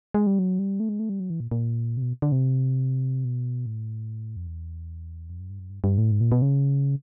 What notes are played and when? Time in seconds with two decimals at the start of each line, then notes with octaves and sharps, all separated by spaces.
0.14 G#3
0.27 G3
0.39 F#3
0.59 G3
0.80 A3
0.89 G#3
0.99 A3
1.09 G3
1.20 F#3
1.30 E3
1.40 A#2
1.51 A#2
1.97 C3
2.02 B2
2.22 D3
2.32 C3
3.25 B2
3.66 A2
4.37 F2
4.47 E2
5.30 F2
5.40 F#2
5.50 G2
5.59 F#2
5.70 G2
5.84 G2
5.98 A2
6.11 G#2
6.21 A#2
6.32 B2
6.42 C#3